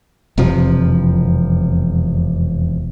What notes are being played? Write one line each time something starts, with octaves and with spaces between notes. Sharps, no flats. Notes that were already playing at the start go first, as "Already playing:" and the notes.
E1 F2 C3 F3